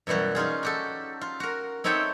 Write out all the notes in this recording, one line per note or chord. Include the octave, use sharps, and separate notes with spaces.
F#2 B2 E3 G3 F#4
C#4 D#4 F4 G#4
F#4 G4 A4
F4
F#4 A#4
C4 D#4 A4 C#5 E5 G5